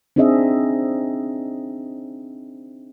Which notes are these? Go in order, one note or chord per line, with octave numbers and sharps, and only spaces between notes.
C4 D4 D#4 G#4 D#5 E5